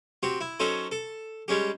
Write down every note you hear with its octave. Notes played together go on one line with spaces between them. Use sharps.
C4 F#4 G4
E4
F#3 C#4 D#4 A4 C5
A4
G3 G#3 C#4 G4